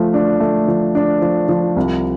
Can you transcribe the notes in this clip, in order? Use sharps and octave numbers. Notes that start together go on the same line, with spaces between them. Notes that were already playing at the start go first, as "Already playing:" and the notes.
Already playing: F3 A3
D4
A3
F3
D4
F3
F3
C2